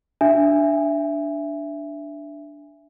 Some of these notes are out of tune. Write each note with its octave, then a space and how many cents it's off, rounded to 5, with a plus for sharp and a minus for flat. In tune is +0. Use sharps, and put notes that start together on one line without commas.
D4 +0 E5 +10 G#5 -15